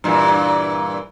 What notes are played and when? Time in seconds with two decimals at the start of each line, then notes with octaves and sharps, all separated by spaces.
0.04 G2 A#2 E3